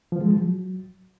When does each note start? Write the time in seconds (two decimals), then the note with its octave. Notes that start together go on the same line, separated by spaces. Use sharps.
0.12 F3
0.21 G#3
0.30 F3
0.39 F#3